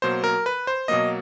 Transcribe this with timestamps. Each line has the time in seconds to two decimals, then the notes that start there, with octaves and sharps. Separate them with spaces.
0.02 B2 F#3 A#3 C5
0.24 A#4
0.46 B4
0.67 C5
0.88 B2 F#3 A#3 D#5